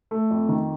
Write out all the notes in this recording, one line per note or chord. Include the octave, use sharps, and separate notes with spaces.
A3
F2
D#3